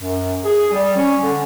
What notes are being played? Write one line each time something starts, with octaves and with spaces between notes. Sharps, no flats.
F#2
G#4
G3
C#4
D3